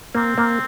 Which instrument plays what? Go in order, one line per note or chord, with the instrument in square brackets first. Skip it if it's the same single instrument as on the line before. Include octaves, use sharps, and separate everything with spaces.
[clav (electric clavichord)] A#3 [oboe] C4
[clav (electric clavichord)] A#3